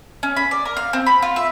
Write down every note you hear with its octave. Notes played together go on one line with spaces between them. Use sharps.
C#4
B5
D5
A#4
F5
C4
B5
F4
E5